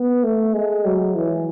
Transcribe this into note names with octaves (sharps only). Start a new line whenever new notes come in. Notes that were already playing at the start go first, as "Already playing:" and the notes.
Already playing: B3
A3
G#3
F#3
E3